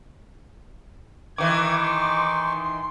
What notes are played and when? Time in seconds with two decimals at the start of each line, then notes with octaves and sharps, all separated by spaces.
1.38 D#3 E3 D#4 C#6 D6 G#6
1.83 C6